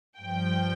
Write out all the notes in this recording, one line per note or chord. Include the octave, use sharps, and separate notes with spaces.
G2 F3 G5